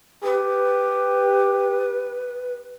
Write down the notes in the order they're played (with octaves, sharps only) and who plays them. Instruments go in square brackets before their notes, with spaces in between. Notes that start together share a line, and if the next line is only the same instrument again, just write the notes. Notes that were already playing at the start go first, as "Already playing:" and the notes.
[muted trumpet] G4 [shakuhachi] B4